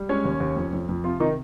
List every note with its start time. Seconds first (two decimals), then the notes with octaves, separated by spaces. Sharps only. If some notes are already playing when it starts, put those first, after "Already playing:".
Already playing: G3
0.09 G#3 C#4 C#5
0.25 D#2
0.40 D#2
0.56 F2
0.73 F2
0.89 F2
1.04 C3 F3 F4
1.20 C3 D#3 D#4